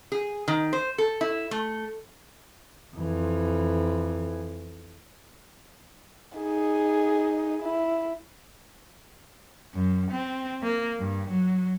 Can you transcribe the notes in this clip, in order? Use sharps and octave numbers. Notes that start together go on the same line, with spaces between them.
G#4
D#3
C5
A4
E4
A3
F2 E3
D#4 G#4
E4
F#2
C4
A#3
G2
F#3